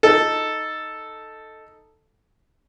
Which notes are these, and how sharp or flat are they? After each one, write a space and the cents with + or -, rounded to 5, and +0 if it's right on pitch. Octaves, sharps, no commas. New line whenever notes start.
D#4 +0 A4 +0